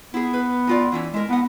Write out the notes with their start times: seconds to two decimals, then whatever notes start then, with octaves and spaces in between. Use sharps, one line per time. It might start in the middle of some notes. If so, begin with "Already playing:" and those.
0.14 B3 E4 G#4
0.34 B4
0.67 A2 F4 D5
0.92 E3 C#4 E4
1.14 G#3 E4 A#4
1.29 A2 B3 F#5